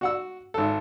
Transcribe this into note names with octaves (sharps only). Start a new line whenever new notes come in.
F#4 F#5 E6
G#1 A4